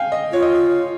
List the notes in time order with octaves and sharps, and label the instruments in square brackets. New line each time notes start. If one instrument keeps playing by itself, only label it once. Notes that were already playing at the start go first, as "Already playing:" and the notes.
Already playing: [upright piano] F5 G5 G#5
D#5
[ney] F4 [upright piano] C#5
[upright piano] D#5
C#5